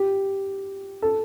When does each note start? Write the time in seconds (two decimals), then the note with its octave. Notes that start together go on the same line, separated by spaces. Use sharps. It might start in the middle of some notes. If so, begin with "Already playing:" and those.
Already playing: G4
1.02 A4